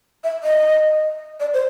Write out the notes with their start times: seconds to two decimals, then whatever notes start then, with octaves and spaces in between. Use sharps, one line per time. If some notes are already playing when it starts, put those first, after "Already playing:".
0.24 E5
0.43 D#5
1.40 D5
1.53 C5